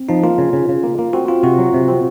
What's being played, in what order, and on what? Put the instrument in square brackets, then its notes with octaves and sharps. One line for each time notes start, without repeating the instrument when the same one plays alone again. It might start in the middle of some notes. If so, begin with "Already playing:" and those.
Already playing: [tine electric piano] C4
[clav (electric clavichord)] F3 [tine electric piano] D#4
[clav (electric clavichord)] A#3 [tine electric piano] F4
[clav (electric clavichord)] C#3
C#3
C#3
A#3
A#3
[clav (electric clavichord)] C4 [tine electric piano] F#4
[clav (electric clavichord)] C4 [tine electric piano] F4
[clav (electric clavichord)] C3 [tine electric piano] F#4
[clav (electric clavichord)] F#3
C3
C4